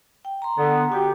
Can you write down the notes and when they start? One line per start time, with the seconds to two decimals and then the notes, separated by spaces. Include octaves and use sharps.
0.25 G5
0.42 A#5 C6
0.57 D3 B3
0.92 F#4 G4 G5